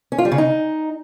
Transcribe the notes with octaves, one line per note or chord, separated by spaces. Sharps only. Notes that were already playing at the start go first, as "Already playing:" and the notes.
C#4
F4
G3
C#3
D#4